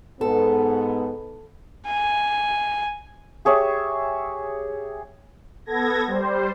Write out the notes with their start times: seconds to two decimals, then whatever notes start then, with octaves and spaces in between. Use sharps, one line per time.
0.21 G#2 B3 A4
1.87 G#5
3.45 G4 G#4 C#5 E5
5.66 B3 A4 G#6 A#6
6.07 G3 C5